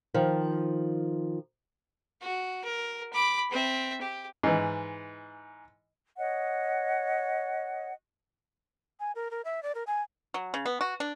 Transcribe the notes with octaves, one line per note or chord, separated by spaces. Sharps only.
D#3 F3
F#4
A#4
B5 D6
C4 E5
G4
G#2 E3
C#5 D#5 F#5
G#5
A#4
A#4
E5
D5
A#4
G#5
F#3
C#3
B3
F#4
D4